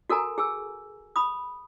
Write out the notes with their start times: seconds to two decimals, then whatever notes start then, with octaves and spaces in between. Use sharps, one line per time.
0.10 F#4 A4 A#4 G#5 A#5
0.38 G#4 G#5 E6
1.16 B5 D#6